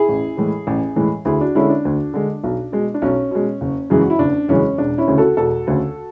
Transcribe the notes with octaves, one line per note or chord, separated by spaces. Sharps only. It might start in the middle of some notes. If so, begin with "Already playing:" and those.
Already playing: E4 G#4
A1
A2 E3 G#3
A1
A2 E3 G#3
D2 E4 G#4
D4 F#4
D3 G#3 C#4 E4
D4
D2
D3 G#3
B1
B2 G#3
D4
B1 C#4
B2 G#3
F#1
F#2 C#3 E3 G#3 G#4
F#4
E4
F#1 D4
F#2 C#3 E3 G#3 C#4
E1 D4
C#4 E4
D2 C#3
F#4 A4
E1 F#4 A4
D2 C#3